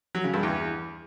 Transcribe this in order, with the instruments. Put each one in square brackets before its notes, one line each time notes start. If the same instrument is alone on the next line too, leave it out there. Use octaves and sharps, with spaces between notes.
[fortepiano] F#3
C#3
G2
E2